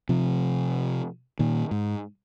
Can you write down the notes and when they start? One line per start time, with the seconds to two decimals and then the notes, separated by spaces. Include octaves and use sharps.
0.09 C3 F3
1.39 A#2 D#3
1.71 G#2